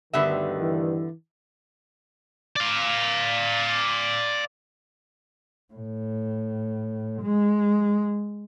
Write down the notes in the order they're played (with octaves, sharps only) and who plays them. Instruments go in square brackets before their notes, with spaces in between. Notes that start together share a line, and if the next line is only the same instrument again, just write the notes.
[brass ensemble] D2 G2 D#3 [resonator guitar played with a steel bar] D3 B3 E5
[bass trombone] E3
[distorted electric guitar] D5 F5
[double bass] A2
G#3